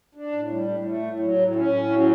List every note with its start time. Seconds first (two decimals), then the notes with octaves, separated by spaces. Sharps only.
0.15 D4
0.32 A2
0.50 G3
0.67 A2
0.85 A3
1.02 A2
1.20 F#3
1.38 A2
1.55 C#4
1.73 A2
1.90 F#3